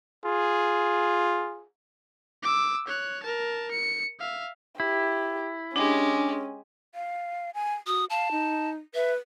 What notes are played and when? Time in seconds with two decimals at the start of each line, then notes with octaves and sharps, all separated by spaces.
0.25 F4 G#4
2.43 D6 E6
2.87 C#5 F#6
3.23 A#4 A5
3.71 C#7
4.20 E5 F5
4.80 E4 G4
5.76 G#3 C#4 D4 G4
6.95 F5
7.54 G#5
7.87 F#4 D#6
8.10 F5 A5
8.32 D#4
8.95 B4 E5